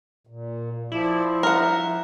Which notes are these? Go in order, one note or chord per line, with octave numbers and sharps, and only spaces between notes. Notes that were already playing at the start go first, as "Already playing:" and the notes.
A#2
F3 E4 D5
A#4 E5 F#5